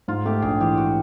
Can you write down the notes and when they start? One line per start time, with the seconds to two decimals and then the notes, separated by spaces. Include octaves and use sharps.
0.08 G#2 F4
0.25 A3 G4
0.42 A#1 G#4
0.60 E3 G4
0.78 F#4